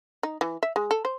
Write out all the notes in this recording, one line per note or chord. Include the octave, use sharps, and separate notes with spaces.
D#4
E3
E5
G#3
A4
C5